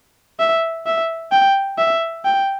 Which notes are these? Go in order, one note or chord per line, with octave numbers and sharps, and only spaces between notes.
E5
E5
G5
E5
G5